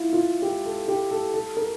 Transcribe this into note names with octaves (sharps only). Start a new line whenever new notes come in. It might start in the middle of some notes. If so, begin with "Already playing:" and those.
Already playing: E4 F4
F4
G4
A4
G4
A4
A4
A#4